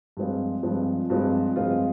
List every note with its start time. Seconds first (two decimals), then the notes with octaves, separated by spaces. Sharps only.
0.17 G2 F3 G#3 C4 F4
0.63 G2 F3 G#3 C4 F4
1.10 G2 F3 G#3 C4 F4
1.56 G2 F3 G#3 C4 F4